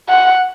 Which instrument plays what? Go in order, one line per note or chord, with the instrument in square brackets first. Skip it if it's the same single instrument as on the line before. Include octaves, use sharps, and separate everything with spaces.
[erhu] F#5